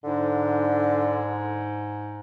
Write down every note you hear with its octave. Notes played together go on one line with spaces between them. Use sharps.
G#2 D3